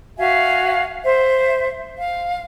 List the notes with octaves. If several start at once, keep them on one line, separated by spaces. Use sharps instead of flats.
F#4 E5 F5 G#5
C5 E5
F5